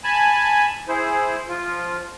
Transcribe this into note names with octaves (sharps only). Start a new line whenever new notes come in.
G#5 A5 B5
E4 G#4 C5
F3 F4